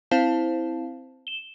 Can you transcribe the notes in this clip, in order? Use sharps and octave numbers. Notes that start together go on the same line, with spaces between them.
C4 E4 C5 F5 A5
E7 G7